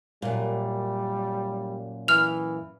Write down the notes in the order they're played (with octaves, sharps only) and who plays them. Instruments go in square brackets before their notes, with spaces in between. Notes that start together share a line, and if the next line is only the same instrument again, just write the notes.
[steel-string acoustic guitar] F#2 A#2 [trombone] G3
[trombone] E3 [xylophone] F6 F7